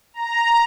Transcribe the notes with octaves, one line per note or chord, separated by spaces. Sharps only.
A#5